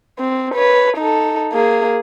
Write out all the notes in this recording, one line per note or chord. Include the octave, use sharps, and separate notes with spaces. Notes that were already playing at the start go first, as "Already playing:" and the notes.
C4
B4 C#5
D#4 A4
A#3 G#4